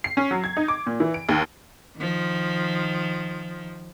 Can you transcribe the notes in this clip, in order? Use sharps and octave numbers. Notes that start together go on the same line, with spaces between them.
C7
C#4
F#3
G#6
D#4
D6
A#2
E3
D7
D#2
D#3 F3